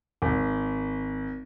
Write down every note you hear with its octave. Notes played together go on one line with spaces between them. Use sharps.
G#1